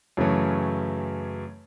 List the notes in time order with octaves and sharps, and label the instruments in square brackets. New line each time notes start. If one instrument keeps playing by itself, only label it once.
[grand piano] F#2 C#3 E3 A3 C#4